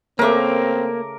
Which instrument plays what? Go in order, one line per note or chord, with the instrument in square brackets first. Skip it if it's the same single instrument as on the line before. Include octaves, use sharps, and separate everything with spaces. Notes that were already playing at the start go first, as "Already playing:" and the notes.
[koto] C#3 A3 [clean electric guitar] A#3 [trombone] C4 [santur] A#4 D6